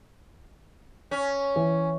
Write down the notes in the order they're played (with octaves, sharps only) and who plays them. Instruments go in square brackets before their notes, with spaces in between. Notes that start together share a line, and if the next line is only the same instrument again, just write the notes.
[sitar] C#4
[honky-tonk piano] E3